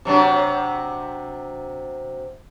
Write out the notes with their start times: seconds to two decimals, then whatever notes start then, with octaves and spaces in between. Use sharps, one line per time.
0.05 C3 F#3 D4